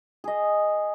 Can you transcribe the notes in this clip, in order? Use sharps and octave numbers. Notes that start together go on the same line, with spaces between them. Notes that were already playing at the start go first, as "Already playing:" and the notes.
G#4 D#5